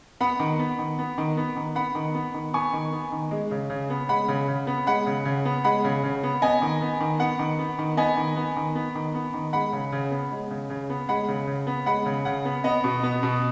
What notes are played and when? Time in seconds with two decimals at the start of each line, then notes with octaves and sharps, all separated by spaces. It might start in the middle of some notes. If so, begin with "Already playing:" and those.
0.20 B3 F#5 B5
0.39 D#3
0.59 B3
0.79 D#3
0.99 B3
1.18 D#3
1.37 B3
1.56 D#3
1.76 B3 F#5 B5
1.95 D#3
2.14 B3
2.34 D#3
2.53 B3 G#5 C#6
2.73 D#3
2.92 B3
3.12 D#3
3.31 G#3
3.51 C#3
3.70 C#3
3.90 B3
4.09 G#3 F#5 B5
4.28 C#3
4.48 C#3
4.67 B3
4.87 G#3 F#5 B5
5.06 C#3
5.25 C#3
5.45 B3
5.64 G#3 F#5 B5
5.84 C#3
6.04 C#3
6.23 B3
6.42 B3 D#5 G#5
6.62 D#3
6.81 B3
7.00 D#3
7.20 B3 F#5
7.39 D#3
7.59 B3
7.78 D#3
7.97 B3 D#5 G#5
8.17 D#3
8.36 B3
8.56 D#3
8.75 B3
8.95 D#3
9.14 B3
9.34 D#3
9.53 G#3 F#5 B5
9.73 C#3
9.92 C#3
10.11 B3
10.31 G#3
10.51 C#3
10.70 C#3
10.90 B3
11.09 G#3 F#5 B5
11.28 C#3
11.47 C#3
11.67 B3
11.86 G#3 F#5 B5
12.06 C#3
12.25 C#3 F#5
12.45 B3
12.64 B3 D#5
12.84 B2
13.03 B3
13.23 B2